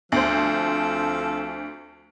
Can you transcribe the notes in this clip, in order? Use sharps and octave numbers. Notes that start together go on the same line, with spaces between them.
D2 F3 C4 A4 C5